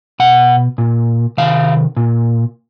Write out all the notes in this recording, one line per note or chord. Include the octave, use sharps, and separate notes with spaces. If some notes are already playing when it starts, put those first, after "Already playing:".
B2 F#5
A#2
C3 D#3 F5
A#2